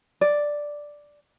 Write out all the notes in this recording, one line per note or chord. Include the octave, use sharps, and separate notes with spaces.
D5